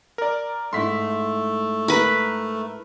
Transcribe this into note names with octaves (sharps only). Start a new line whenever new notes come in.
A#4 D5
G#2 A3 E4 C6 B6
A#4 B4 B5